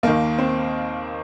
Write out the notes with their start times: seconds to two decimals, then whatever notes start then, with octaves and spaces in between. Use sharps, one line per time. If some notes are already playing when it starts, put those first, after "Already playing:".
0.03 D#2 D#3 A#3
0.38 C4